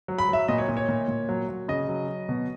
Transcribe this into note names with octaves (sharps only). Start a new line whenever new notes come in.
F#3
B5
F#3 E5
A#2 D#5
C#5
A#2
C#5
A#2
A#2
F#3
F#3
C#3 D#5
F#3
F#3
B2